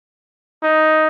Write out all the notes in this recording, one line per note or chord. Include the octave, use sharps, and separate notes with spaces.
D#4